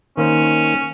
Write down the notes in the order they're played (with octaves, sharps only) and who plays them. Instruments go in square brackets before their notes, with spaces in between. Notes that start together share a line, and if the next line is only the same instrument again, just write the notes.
[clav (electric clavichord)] D#3 A#3 C5 [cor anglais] C#4